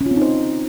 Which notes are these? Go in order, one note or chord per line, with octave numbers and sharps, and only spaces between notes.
C#4
F4
C4
D#4
C5